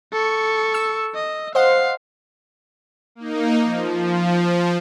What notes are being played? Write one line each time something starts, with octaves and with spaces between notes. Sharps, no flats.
A4 C#6
E6
D#5
C5 D#5 F5 F#5
A#3 D#4
F3